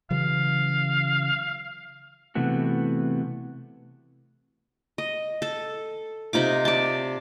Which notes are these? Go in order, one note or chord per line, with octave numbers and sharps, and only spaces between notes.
C#3 E3 F#3 F5
C3 E3 A3 B3 F#4
D#5
A4
C3 D#4 F4 D6
D5 A5